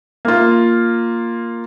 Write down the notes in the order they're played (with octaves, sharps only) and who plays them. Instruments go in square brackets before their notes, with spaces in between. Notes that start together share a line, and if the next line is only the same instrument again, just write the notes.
[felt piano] A#3 F4